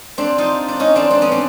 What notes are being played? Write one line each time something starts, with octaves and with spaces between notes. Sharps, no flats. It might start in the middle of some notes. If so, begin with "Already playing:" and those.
C4 D4 D5
D#4 F4
D4
C#4 D#4 D#5
C4 D4 D5
C4 D4
B3 C#4
C4 D4